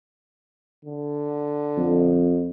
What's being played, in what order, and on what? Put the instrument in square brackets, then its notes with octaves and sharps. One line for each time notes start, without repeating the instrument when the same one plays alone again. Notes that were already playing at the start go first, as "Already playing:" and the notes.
[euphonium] D3
[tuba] F2